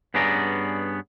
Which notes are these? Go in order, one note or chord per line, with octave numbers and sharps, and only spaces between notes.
G2 B3 C#4 G#4 D5 A#5